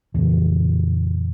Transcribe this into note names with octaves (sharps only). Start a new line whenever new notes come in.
F2 A#2 C#3 E3